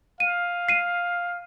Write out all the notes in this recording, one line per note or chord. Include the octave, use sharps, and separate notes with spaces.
F5 D#7
C7 D#7